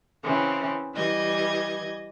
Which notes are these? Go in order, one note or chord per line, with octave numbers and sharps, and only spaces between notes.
C#3 E3 C4 C#4
E3 G3 D#5 G#6